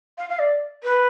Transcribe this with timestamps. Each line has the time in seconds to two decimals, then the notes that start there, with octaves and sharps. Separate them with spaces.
0.18 F5
0.29 F5
0.39 D5
0.83 B4